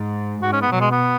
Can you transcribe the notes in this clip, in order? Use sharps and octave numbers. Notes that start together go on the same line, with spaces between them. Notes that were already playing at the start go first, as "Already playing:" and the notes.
Already playing: G#2
G#2 F#4
C#4
B3
B2 F#3
G#3
B3